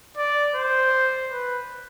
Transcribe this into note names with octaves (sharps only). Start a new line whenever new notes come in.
D5
C5
B4